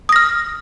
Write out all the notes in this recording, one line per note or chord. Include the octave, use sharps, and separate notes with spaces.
D#6 F6 A#6